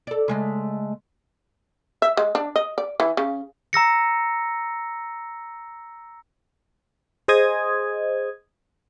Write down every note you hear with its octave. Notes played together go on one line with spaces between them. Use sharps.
A4 D5
C#3 G#3 A3
E5
G#3
D4
D#5
D5
E3
C#3
A#5 E6 A#6 C#7
G#4 C5 D#5 D#6 G#6